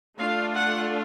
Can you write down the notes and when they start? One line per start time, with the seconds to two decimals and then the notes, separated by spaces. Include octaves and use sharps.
0.19 A3 D4 F4 F5
0.55 F#5